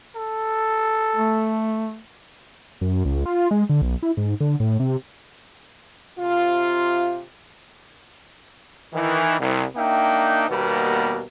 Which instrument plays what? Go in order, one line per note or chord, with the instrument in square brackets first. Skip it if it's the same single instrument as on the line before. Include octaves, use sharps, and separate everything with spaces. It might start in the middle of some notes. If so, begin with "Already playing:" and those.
[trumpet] A4
[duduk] A3
[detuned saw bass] F#2
C#2
F4
G#3
D3
B1
E4
G#2
D3
A2
C3
[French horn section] C3 F4
[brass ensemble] D#3 E3
C2
A#3 D4 D#4 E5 G5
D#2 B2 G3 A#3 B3 A#4